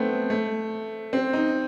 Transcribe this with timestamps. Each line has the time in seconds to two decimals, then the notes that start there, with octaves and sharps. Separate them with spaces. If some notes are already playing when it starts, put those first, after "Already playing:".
Already playing: A3 B3 C4
0.30 A3
1.13 C4
1.33 D#4